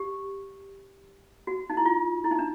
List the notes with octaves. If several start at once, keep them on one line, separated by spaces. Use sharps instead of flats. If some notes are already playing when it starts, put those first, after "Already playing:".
Already playing: G4
F#4
D#4
E4
F4
E4
D#4
D4